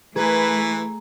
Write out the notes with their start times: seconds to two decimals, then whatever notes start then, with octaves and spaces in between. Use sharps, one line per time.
0.16 E3 A3 G#4 B4 A#5